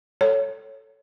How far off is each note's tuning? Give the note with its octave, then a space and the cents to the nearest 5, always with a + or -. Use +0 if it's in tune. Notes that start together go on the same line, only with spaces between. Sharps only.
A4 +0 C#5 +0